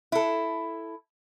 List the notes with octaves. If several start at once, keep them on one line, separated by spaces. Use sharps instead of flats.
E4 A4